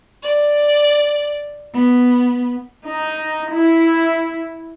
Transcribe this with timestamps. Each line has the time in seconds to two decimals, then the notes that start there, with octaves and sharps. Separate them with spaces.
0.22 D5
1.74 B3
2.87 D#4
3.53 E4